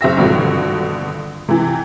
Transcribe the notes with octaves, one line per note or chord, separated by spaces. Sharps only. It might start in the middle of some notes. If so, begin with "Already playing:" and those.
F#1 C5 E5 A#6
G#1 G2 B2 D3 F3
C3 E3